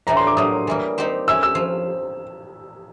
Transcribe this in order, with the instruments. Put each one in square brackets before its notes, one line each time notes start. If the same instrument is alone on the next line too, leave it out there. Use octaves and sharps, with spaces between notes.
[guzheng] A2 E3 A3 D4 [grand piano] A#5
[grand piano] C6
D6
[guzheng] A2 F#3 A#3 [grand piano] D#6
[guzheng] E3 G3 A#3
C4 D#4 G4 C5
[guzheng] A3 C#4 E4 [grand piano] E6
[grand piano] E6
[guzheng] F3